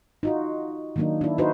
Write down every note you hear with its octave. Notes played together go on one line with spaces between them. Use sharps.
D#4 F4 F#4
D#3 F#3 A#3 D4 D#4
D4 E4
D#4 E4 F#4 B4 C5